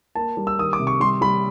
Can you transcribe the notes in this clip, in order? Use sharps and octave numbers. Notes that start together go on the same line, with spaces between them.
A#3 A5
G3
E6
D#3 D#6
D6
C3
C#6
G3 C6
G3 B5